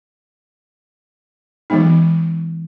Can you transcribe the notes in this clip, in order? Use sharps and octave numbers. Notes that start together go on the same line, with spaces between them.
E3 F#3 G#3 B3 D#4